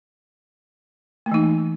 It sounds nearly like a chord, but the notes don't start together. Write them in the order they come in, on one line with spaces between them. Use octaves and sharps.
A3 A#3 E3 D#4